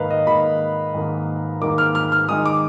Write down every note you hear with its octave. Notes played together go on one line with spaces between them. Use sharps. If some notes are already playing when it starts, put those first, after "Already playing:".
Already playing: G#2 D#3 A#3 B4 D#5 F5
D#5
G#2 D#3 A#3 B5
G#2 D#3 A#3
G#2 D#3 A#3 D6
F6
F6
F6
D#3 G#3 D#4 D#6
D6